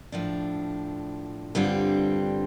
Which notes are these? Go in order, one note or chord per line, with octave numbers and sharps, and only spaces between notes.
A2 F3 D4
G2 D3 G3 C4 F4